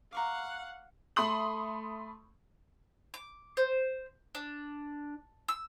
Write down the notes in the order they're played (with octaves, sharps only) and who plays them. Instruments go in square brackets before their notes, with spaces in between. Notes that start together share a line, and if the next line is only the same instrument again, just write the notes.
[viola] F5 F#5 [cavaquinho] A#5 C#6 D6
[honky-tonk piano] A3 B5 C6 D#6 F#7
[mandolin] D6
C5
D4
E6